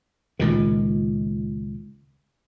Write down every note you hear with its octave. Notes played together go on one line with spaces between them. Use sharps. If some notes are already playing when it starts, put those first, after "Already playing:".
C#2 A#2 D#3